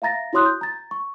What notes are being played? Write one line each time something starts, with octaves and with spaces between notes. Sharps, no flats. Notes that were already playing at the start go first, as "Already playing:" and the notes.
E5 F5 A#5 A6 A#6
E4 F#4 C#5 C6 D#6 F#6
G6
A#5 A6
C#6